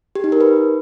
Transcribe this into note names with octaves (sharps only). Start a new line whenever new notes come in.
G4
D#4
A#4
B4